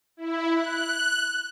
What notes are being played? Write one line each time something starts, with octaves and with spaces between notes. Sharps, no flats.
E4
F#6